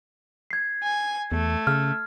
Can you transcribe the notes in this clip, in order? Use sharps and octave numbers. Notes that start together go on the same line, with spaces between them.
G#6 C7
G#5
E2 A3
C#3 F6